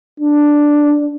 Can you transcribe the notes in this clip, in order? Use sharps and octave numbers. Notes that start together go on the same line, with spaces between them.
D4